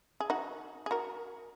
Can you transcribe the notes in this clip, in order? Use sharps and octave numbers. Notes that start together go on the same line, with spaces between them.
G#4
D#4 F#4
G#4
F#4 A#4